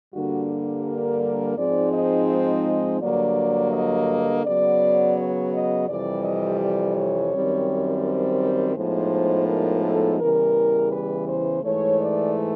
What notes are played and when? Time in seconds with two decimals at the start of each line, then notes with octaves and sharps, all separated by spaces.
0.13 G2 D3 G3 A#3 D4 F#4
0.85 A#4
1.57 G#2 F3 G#3 C4 D#4 D5
1.93 D#5
2.29 D#5
3.01 G2 D3 F#3 A#3 D5
3.73 D#5
4.44 C#3 F#3 B3 D5
5.16 C#5
5.53 D#5
5.88 F2 C3 E3 G3 D5
6.24 D#5
6.60 D5
6.96 C#5
7.32 F#2 D#3 G3 C4
8.04 C5
8.76 A2 F3 G#3 B3 D#4 C5
9.47 A#4
9.84 A4
10.20 E2 C#3 E3 G3 A#4
10.92 B4
11.28 C5
11.63 G#2 E3 A3 C#5
12.00 D5